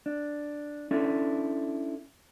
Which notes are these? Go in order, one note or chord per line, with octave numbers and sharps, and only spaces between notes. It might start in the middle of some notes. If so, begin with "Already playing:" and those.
D4
C#4 D4 E4 A4